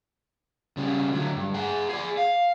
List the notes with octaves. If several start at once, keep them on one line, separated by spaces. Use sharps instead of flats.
C#3 G3
D3 F#3
G2
G#4 F#5
G#4 D5
F5